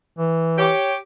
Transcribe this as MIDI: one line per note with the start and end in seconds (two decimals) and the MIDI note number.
0.19 0.70 52
0.58 0.94 67
0.58 0.94 73